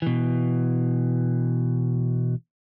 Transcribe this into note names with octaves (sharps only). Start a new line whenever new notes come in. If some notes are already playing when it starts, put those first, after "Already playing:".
B2 E3